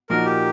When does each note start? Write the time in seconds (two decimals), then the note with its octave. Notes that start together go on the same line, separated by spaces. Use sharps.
0.10 A#2 F3 A#3 D#4 F#4 A#4
0.25 G4